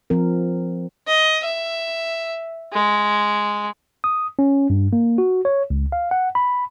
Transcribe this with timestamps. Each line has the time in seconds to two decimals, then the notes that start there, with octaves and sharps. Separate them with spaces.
0.10 F3 C4 A#4
1.08 D#5
1.44 E5
2.74 G#3
4.04 D#6
4.39 C#4
4.70 G2
4.93 A#3
5.18 F#4
5.45 C#5
5.70 C#2
5.92 F5
6.11 F#5
6.35 B5